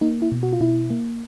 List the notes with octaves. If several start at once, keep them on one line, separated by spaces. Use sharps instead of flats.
A#3 D#4
E4
B2
F#4
F4
B2 E4
A#3